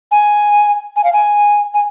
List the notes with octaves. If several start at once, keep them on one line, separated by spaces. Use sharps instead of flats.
G#5
G#5
F5
G#5
G#5